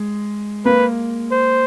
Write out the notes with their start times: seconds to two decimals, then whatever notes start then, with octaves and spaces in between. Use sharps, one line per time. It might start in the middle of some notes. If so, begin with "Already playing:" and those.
Already playing: G#3
0.65 A#3 B4
1.31 C5